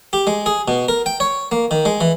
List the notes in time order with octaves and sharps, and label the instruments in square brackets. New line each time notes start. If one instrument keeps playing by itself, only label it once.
[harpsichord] G4
G#3
G#4
B2
A#4
G5
C#5
A#3
D#3
G#3
E3